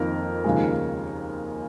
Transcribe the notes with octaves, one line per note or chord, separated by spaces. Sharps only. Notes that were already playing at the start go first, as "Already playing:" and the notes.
Already playing: F2 D#3 A#3 D#4 A#4
D#2 C#3 F3 G#3